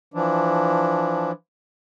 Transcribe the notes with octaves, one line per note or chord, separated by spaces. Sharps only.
E3 F3 D4